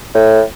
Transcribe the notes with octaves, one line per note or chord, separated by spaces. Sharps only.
A2